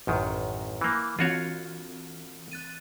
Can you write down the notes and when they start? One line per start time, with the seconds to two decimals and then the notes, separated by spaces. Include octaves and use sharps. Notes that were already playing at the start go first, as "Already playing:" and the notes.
0.07 A1 F#2 D#3
0.81 E3 A#3
1.19 E3 C4 F4 F#4 C#5
2.52 F#6 A6 D#7